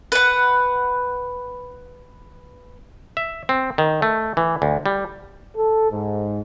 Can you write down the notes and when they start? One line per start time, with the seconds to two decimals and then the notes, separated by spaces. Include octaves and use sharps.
0.12 B4 F#5
3.17 E5
3.49 C4
3.78 D#3
4.02 A3
4.37 E3
4.62 D2
4.86 G3
5.55 A4
5.91 G#2